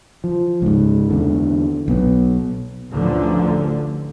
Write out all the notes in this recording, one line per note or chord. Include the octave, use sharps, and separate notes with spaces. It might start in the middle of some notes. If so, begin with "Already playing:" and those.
F3
C#2 G#2
E2 D3
B1 B3
A1 D2 D3 F3